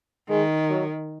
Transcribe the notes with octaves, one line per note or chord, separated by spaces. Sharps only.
D#3 G#3
F#3